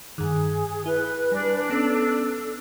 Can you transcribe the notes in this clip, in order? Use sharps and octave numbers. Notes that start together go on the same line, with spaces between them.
G2 D#3 G#4
E4 B4
G3 D4 G#5
B3 C#4 A4